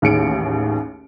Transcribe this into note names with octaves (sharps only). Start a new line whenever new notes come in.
A1 D#2 G#4 C#7 D7